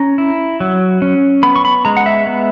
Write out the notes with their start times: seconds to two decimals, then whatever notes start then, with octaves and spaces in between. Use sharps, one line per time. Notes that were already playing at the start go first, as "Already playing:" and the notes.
Already playing: C#4 A#5
0.18 E4
0.60 F#3
1.02 C#4
1.43 B3 B5
1.56 C#6
1.65 B5
1.85 G#3 A#5
1.97 F#5
2.06 E5
2.27 B3